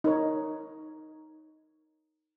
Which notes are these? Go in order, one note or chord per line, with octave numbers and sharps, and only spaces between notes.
D#4 A#4 C#5